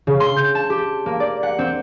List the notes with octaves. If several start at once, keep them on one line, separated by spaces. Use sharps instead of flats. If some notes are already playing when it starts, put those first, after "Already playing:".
C#3
C6
G6
A5
G4
A#3
D5
F#5
C4